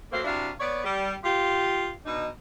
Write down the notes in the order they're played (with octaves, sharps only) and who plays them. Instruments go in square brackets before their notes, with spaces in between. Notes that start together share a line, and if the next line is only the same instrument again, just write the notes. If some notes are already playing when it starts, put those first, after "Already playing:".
[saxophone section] F#3 A3 A#3 C5 F5
C3 D4 E4 F#4 F5
B3 C#5 D5
G3
F4 G4
B2 D4 D#4